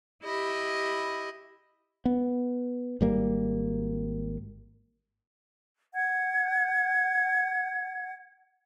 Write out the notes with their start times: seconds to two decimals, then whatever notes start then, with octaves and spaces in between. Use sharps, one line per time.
0.24 E4 G4 D#5 B5
2.05 B3
3.01 G#1 G3 A#3
5.96 F#5 G#6